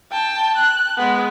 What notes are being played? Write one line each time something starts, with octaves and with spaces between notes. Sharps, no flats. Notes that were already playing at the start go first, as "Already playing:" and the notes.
G5 A5
F#6
G#3 B3